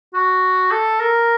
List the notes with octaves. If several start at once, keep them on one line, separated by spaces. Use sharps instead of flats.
F#4
A4
A#4